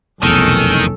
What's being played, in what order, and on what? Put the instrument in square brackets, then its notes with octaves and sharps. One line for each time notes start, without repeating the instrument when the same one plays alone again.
[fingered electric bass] F1 E2 [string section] B1 [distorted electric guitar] D#3 [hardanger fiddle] C#4 A4